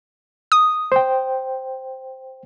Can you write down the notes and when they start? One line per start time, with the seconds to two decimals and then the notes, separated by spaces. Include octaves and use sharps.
0.52 D#6
0.92 C5 G5